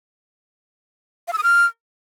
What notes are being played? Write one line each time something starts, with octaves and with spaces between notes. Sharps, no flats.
F5
E6
D#6
F6